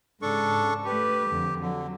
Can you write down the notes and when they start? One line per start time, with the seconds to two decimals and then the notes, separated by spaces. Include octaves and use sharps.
0.22 G#2 C#3 D4 A4 C#6
0.85 A3 G4 B4
1.30 F2 D3
1.60 D3 F#3